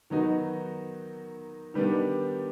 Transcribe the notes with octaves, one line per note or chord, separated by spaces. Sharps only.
D#3 F#3 B3 D#4 F#4
D#3 G3 B3 D4